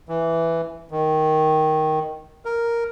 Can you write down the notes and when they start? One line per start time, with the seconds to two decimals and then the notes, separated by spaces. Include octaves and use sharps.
0.09 E3
0.91 D#3
2.45 A#4